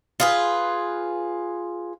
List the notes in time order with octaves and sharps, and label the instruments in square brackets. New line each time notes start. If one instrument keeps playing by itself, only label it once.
[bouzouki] F4 G#4 B4